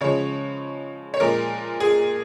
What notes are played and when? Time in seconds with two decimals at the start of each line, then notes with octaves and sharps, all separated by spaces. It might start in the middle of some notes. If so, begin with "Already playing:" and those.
0.01 C#3 F3 G#3 C#5
1.14 C#5
1.20 A#2 F3 G#3 A#4
1.80 G#4